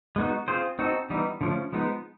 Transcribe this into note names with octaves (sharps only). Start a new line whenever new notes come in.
G#3 B3 D#4 F#4
C4 F4 G#4 C5
C4 D#4 F#4 A4
E3 G3 B3 D#4
D3 F3 A3 C#4
F3 G#3 B3 D#4